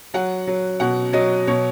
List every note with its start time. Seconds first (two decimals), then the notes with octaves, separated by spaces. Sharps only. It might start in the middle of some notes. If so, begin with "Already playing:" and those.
0.14 F#3 F#5
0.47 F#3
0.80 B2 F#5
1.13 F#3 D#5
1.47 B2 C#5